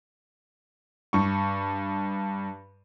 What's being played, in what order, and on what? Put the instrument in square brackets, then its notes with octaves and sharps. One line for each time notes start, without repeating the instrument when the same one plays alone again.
[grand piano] G2 C#6